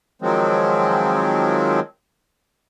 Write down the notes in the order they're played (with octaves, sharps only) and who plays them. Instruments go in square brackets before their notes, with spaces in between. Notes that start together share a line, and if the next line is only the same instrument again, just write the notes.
[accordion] D#3 F3 F#3 G#3 C4